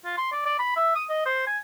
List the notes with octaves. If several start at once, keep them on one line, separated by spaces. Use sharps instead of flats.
F4
C6
D5
D5
B5
E5
D#6
D#5
C5
G#5